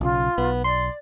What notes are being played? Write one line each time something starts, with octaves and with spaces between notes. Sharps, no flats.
B1 C#3 F4
B1 B3
D5 C6